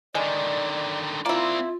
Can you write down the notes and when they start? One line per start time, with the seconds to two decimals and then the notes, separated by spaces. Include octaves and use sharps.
0.15 D3 D#3 G#3 D5
1.26 A#3 C4 E4 F4 D5